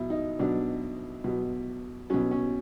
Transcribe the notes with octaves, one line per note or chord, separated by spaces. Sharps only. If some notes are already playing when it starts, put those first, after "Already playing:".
Already playing: B2 F#3 E4
D#4
B2 F#3 D4
B2 F#3
B2 F#3 C#4
C#4